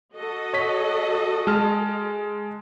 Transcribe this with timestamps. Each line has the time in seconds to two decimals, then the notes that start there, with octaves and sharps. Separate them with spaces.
0.16 F#4 A4 D#5
0.53 C#5 B6
1.47 G#3 A5 F6